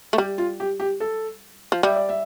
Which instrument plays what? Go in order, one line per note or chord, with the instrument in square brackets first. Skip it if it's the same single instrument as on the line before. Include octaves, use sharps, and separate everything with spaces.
[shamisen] A3
[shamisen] G3 [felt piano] G4
[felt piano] F4
G4
G4
A4
[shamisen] F3
[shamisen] G3 [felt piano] E5
[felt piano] D5
E5